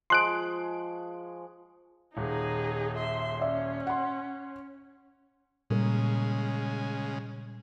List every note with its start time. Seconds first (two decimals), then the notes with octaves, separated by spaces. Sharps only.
0.10 F3 G#3 C6 C#6 F#6 D7
2.17 D#1 D#4 G#4
2.96 E5 C6
3.40 C#4 D5 E5
3.87 F#5 C6
5.70 A#2 C#3 G3 G#3 A#4